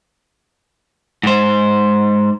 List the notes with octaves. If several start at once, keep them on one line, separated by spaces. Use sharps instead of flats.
G#2 C5